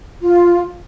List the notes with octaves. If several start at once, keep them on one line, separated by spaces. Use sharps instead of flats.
F4